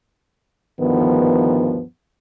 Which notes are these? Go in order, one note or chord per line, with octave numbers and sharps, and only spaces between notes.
D2 G2 D#3 F3 B3